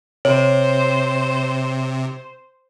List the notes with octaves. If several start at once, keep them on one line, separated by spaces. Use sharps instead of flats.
C3 C5 C#5